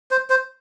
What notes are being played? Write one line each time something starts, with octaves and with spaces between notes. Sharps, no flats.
C5
C5